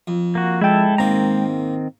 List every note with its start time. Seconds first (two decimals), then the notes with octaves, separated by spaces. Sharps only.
0.07 F2
0.35 A#3 F#4
0.61 G#3 E4 A4 G5
0.98 G#2 D#3 A#3 C4 A#5